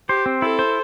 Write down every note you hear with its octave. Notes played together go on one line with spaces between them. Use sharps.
G4 C5
C4
E4 A4
C5